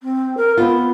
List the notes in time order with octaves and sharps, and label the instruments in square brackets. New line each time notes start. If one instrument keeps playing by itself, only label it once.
[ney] C4
A#4
[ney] B3 [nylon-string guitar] C4 F4